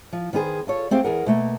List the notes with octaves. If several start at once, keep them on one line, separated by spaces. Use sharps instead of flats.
F3
D#3 B3 F#4 G#4 C5
F4 A4 C#5
A3 C4 G4 G#4 F5
E2 G#4 A#4 F#5
B2 A3 A#3